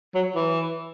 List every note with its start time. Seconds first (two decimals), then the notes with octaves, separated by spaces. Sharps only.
0.15 F#3
0.35 E3